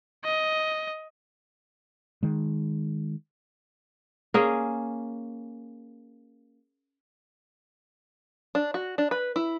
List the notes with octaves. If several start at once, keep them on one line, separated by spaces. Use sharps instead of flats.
D#5
D#3 G#3
A#3 C#4 G#4
D4
F#4
D4
B4
E4